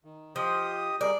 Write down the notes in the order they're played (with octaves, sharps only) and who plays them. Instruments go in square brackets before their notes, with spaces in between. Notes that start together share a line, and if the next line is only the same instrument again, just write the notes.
[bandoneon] D#3
[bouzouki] F3 [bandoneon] G4 D#5 D#6
[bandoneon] G3 G#4 A#4 [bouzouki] D5